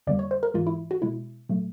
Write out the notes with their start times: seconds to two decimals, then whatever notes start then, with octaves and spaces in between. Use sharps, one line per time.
0.07 F2 D3 G3 A#3 D5
0.19 C#5
0.31 C5
0.43 A#4
0.54 G#2 E3 G#3 F4
0.67 E4
0.91 F#4
1.02 B2 G#3 E4
1.49 A#2 F#3 A3